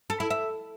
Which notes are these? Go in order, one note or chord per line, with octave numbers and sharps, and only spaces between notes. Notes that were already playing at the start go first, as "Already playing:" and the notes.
A4
E4
E5